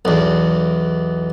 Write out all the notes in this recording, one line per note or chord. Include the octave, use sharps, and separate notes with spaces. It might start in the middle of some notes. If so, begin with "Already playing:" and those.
B1 E2